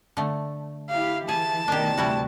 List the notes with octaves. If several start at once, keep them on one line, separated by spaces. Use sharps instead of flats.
D3 A3
E4 G4 F5
E3 G#4 A5
B2 D#3 A3 D4 G4
D2 C3 E3 G3 E4 F#4